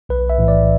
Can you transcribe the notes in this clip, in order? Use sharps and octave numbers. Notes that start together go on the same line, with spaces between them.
B1 B4
E5
A2 E3
D5